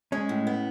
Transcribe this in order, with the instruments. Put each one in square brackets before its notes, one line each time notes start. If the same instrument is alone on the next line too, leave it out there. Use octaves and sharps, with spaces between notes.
[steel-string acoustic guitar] G#3 [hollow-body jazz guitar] C#4
[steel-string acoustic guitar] A2
B3